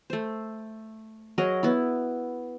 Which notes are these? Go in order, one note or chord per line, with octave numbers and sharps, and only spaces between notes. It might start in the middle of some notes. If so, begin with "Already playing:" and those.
A3 C5
F#3 G#4 A#4 D#5
B3 E4